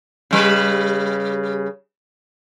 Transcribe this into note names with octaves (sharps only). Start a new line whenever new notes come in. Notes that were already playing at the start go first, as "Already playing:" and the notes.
C#3 G3 B4